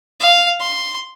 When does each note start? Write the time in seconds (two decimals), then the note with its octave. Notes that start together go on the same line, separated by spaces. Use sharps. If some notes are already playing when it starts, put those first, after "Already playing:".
0.20 F5
0.60 C6